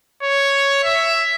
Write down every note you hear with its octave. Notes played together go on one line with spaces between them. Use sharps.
C#5
E5